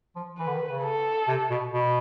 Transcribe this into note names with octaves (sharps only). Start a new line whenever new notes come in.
F3
E3 B4
D3
D#3
C#3
A4
C3
B2
B2